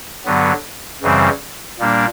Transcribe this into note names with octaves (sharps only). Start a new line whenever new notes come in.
G2 D3 F#3 B3
F#2 C#3 E3 G3 C4
A#2 G3 A#3 D4